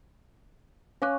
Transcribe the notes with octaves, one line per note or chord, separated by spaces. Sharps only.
C#4 F5 D6 F#6